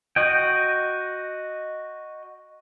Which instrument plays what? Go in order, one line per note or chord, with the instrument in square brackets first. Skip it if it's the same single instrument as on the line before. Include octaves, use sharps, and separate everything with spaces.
[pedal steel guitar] F#4 D#5 G5